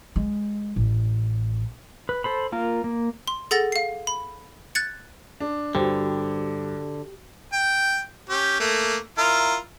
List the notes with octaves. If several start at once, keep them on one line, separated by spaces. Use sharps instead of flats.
G#3
A1
B4
A4 C5 B5
A#3 F4 A#4
A#3
C6
G#4 A4 F#5 A6 A#6
F5 C7
B5
F#6 G#6 A6 C#7
D4
G2 D3 F#4 G4 C5 G5
G5
C#4 G4
A3 A#3
E4 F4 A#4